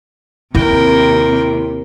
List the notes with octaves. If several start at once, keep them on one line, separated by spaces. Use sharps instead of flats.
D#2 C3 C4 E4 A#4 G5